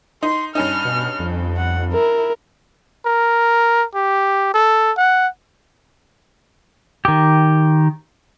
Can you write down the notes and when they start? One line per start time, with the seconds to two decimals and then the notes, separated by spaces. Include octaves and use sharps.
0.23 D#4 C6
0.55 G2 C#4 D#4 F6
0.85 B2
1.20 F2
1.57 F#5
1.92 E4 A#4
3.06 A#4
3.95 G4
4.54 A4
4.97 F#5
7.05 D#3 G4